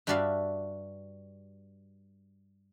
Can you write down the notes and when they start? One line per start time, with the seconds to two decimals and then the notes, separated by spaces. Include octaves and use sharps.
0.07 G2 G3 F#4 D5 E5 F5